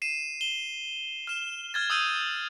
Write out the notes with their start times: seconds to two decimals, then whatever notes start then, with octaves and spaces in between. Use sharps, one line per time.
0.02 C7 D#7 E7
0.41 E7 G7
1.27 F6 E7
1.74 F6 G#6 A6
1.90 D#6 E6 G6 D#7